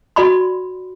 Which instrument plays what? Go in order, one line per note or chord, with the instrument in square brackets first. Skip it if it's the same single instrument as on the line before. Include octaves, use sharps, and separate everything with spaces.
[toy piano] F#4 D5 B5 C6